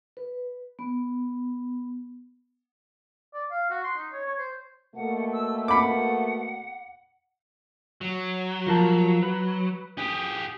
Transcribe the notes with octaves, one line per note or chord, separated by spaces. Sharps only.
B4
B3
D5
F5
F#4
C6
D#4
C#5
C#5
C5
B2 A3 A#3 F#5
E6
F#5 B5 D6
F#3
F3 A#4 A5
B4
G4 G#4